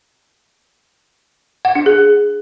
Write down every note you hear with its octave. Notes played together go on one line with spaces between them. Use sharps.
F#5
D4
G#4